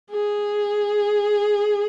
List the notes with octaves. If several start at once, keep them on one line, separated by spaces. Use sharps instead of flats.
G#4